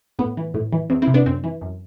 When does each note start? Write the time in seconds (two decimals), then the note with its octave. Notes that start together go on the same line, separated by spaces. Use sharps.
0.19 A2 B3
0.37 E3
0.54 A2
0.73 E3
0.90 E2 C4
1.02 C4 E4
1.08 C3
1.14 B3 D4
1.26 F#2 C4
1.44 E3
1.61 F#2